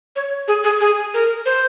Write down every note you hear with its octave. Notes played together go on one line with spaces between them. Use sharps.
C#5
G#4
G#4
G#4
A#4
C5